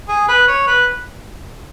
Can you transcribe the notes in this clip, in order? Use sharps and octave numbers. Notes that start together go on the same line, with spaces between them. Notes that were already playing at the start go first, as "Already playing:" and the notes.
G#4
B4
C#5
B4